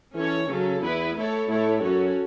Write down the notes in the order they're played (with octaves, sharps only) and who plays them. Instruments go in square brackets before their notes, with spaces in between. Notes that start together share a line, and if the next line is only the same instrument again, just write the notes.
[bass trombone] E3 [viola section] C#4 A4 C#5
[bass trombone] C#3 [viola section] F#3 C#4 A4
[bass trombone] E2 [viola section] B3 E4 B4
[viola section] A3 E4 A4 C#5
[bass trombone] A2 [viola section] A3 E4 A4 C#5
[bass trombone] F#2 [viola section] C#4 F#4 A4 C#5